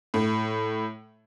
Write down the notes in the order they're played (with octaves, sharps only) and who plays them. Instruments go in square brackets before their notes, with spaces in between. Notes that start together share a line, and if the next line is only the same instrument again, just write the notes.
[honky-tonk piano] A2